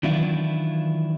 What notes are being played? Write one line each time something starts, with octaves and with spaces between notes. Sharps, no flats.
D#3 E3 F#3 D4 E4 F4